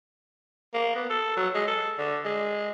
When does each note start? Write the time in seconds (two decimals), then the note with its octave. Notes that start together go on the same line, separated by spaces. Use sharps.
0.74 A#3
0.95 B3
1.09 A4
1.36 F#3
1.55 G#3
1.67 A4
1.98 D3
2.25 G#3